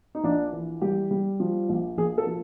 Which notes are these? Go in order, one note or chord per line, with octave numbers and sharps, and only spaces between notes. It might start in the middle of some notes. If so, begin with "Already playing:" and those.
D#4
A#1 D4
E3
G3 G4
G3
F3
A#1
A#1 G#4
A4
F3